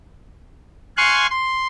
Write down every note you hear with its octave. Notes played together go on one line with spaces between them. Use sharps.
F5 G#5 C6 C#6 F#6
C6